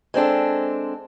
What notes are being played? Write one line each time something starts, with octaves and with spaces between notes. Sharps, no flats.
G#3 C4 D4 A4